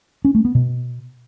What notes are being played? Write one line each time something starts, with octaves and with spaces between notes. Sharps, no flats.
C#4
A3
B3
B2